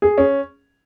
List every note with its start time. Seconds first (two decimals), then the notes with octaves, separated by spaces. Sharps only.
0.02 G#4
0.18 C#4